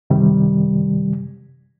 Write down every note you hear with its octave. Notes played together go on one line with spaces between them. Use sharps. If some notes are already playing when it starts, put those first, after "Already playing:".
F#2 C3 D#3 G3